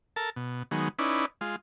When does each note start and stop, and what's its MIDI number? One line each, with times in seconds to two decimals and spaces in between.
0.16 0.30 69
0.16 0.30 70
0.16 0.30 81
0.36 0.63 47
0.71 0.88 51
0.71 0.88 54
0.71 0.88 56
0.71 0.88 59
0.99 1.26 61
0.99 1.26 63
0.99 1.26 64
0.99 1.26 71
0.99 1.26 74
1.41 1.56 56
1.41 1.56 65